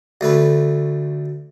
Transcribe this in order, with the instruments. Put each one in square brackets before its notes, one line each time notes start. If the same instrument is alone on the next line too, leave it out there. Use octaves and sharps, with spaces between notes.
[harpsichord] D2 A3 B4